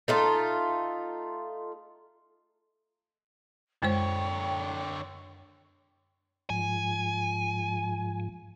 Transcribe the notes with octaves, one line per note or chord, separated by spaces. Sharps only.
A3 D#4 F4
F#2 D3 G#3 C5 C#5 G5
G#2 F3 G#5